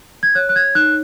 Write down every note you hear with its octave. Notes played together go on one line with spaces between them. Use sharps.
G#6
C#5 F#6
F#6
G#6
D#4 F#6